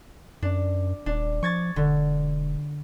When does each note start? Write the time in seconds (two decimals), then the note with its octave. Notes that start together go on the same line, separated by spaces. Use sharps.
0.42 F#2 D4
1.06 D#1 D4
1.43 F3 C#6 G#6 A6
1.76 E1 D3